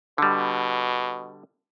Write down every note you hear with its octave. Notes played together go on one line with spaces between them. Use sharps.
B2 D3 G3